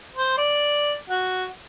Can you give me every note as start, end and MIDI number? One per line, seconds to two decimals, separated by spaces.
0.16 0.37 72
0.38 0.93 74
1.10 1.45 66